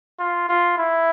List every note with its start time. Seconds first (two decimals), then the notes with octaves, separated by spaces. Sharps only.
0.19 F4
0.49 F4
0.77 E4